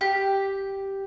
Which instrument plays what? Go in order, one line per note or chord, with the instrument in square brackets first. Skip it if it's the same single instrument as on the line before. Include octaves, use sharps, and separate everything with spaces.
[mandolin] G4